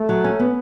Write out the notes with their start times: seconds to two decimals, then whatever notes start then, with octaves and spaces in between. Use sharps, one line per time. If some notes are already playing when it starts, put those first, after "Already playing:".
Already playing: A3
0.09 F#3
0.24 C#4
0.39 B3